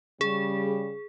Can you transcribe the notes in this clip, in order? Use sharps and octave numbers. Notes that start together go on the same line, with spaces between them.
C#3 G3 G#4